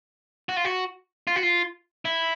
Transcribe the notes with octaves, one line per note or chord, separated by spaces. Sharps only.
F#4
F4
F#4
F4
F#4
F4
E4